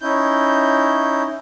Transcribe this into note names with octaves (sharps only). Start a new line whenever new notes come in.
C#4 D#4 E4 G6